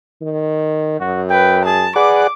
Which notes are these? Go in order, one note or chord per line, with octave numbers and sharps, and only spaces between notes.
D#3
F#2 F#4
B4 G5
G#4 A5
G#4 B4 D5 F#5 D6